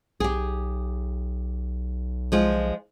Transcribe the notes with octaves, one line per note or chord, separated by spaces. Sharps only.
B1 G4 G#4
F3 G#3 F4